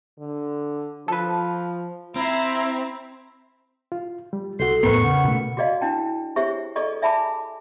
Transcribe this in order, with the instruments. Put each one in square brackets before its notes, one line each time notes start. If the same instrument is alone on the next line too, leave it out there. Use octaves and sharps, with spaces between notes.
[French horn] D3
[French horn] F3 [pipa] A4 B4
[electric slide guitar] C4 [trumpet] E4 [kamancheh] E5 A#5
[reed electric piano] F4
G3
[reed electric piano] C2 F#4 [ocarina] A4 [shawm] C6
[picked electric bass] E2 A2 B3 [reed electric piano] A#4 B4 [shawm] C#6
[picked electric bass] C#3 [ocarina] F#5
[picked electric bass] B2 A3
[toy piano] F#4 G#4 D5 D#5 F5
D4 E4 G5 A5
G4 G#4 C5 C#5 E5 C#6
G#4 A4 D5 D#5 C#6
D5 E5 G#5 A5 B5 D6